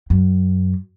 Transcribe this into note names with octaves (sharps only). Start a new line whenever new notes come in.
F#2